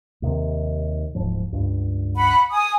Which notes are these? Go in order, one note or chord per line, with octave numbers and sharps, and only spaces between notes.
D#2 C3 D#3
D1 G#2 F3
C#2 G2
F#5 B5
G#5 D#6